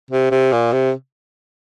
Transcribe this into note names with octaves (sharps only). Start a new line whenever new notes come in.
C3
C3
A#2
C3